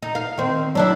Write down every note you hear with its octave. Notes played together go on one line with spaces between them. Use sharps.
D#4
F5
D#3 C4
F#3 D4 E4